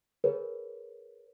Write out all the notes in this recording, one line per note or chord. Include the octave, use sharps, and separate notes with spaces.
G#4 A#4 B4 C#5